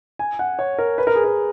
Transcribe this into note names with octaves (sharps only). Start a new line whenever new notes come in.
G#5
F#5
C#5
A#4
B4
A#4
G#4
A#4